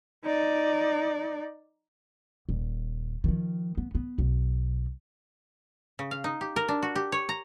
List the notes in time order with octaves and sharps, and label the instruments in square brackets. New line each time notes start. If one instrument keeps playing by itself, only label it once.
[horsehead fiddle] D#4 D5
[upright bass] D#1
D#3 F3
B3
B3
B1
[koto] C#3
F5
D#4
G4
A#4
D4
F#4
G4
C#5
A#5